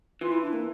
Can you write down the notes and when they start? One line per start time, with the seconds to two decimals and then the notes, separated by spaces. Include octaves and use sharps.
0.21 E3 F4
0.31 E4
0.42 D4
0.53 A#3